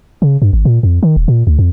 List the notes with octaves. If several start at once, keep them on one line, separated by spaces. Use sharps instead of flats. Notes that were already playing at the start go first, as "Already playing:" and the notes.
C#3
G2
G#1
A#2
F2
D#3
D#1
A#2
D2
F2